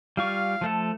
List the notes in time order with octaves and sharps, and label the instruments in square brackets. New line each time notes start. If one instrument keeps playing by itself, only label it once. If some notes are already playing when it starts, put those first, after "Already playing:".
[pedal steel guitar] G3 F4 C#6 [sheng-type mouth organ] F5
[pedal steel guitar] F3 A3 A4